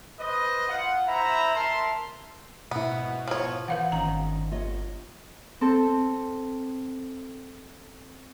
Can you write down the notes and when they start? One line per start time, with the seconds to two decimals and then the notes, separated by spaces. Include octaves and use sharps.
0.19 B4 C5 D#5
0.69 F4 F#5
1.07 E4 C5 E5 A#5 B5
1.54 A#4 E5 A5 C6
2.71 G#2 B2 B3 E4
3.28 F3 C#5
3.68 E3 B4 F5 F#5
3.92 G1 D#3 C#4 A#5
4.52 F4 C#5 D#5
5.61 C4 A4